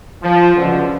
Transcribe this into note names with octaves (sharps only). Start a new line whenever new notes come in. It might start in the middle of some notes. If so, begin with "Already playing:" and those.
F3
C#2 B2 D3